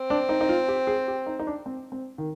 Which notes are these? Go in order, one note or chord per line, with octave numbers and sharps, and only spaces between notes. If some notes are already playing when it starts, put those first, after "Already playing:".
Already playing: C4
D4
D#4
D#4
F4
G4
G#4
G4
D#4
D#4
D4
C4
C4
D#3